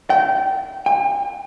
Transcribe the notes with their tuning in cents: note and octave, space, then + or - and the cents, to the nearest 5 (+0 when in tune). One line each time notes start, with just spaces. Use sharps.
G5 -25
G5 +45